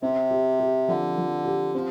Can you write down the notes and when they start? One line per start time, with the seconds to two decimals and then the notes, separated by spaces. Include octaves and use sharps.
0.02 C3 C4
0.31 G4
0.60 G4
0.88 D3 F3
1.17 F3
1.45 G4
1.74 F3 C4